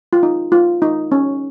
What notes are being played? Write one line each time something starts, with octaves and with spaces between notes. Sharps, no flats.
F4
D#4
F4
D#4
C#4